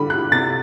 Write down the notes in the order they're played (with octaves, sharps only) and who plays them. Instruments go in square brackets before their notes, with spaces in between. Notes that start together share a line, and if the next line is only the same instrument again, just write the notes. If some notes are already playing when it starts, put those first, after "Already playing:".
Already playing: [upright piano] D3 G3 B5
F#6
C3 A6